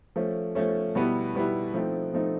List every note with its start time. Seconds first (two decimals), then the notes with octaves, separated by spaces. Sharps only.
0.16 F3 A3 C#4
0.55 F3 A3 C#4
0.95 B2 G3 B3 E4
1.35 B2 G3 B3 E4
1.74 F3 A3 C4 D#4
2.13 F3 A3 C4 D#4